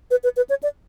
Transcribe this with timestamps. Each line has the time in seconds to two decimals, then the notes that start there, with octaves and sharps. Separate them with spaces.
0.11 B4
0.24 B4
0.37 B4
0.49 C#5
0.63 D5